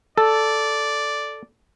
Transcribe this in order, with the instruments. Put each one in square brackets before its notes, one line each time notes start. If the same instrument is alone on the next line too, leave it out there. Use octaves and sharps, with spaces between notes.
[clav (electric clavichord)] A4 [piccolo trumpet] D5